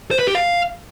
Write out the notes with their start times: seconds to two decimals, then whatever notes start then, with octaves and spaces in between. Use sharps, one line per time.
0.11 C5
0.19 B4
0.27 G4
0.35 F5